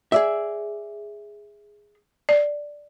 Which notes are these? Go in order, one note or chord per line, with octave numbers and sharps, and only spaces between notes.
G#4 D5 E5
D5